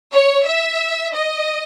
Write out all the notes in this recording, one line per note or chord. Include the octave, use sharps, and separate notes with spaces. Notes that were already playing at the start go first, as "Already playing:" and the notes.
C#5
E5
D#5